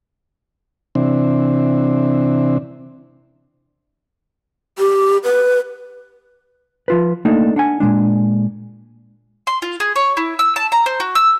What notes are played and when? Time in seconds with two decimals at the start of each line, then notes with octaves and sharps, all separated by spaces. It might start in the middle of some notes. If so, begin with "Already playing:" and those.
0.95 C3 E3 C4 D4
4.78 G4
5.24 B4
6.88 F3 F4 B4
7.25 A3 A#3 D4 D#4
7.56 D4 F#5 G#5
7.80 A#2 D3 G#3 D4
9.47 C6
9.62 F4
9.80 G#4
9.96 C#5
10.17 E4
10.39 E6
10.56 A5
10.72 A#5
10.86 C5
11.00 F#4
11.15 E6